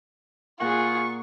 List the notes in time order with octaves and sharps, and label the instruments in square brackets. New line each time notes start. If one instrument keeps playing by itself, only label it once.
[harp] A#2 A#4 F#5 [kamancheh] F4 G#4 [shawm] C#6